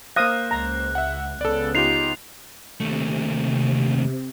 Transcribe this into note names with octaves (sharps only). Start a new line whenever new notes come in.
A#3 C5 F5 D#6 F#6 A#6
C#2 A#5
E5 F#5
C#2 C#3 B3 A4 D5
D#4 F4 G4 C7 F7
D#2 C3 A3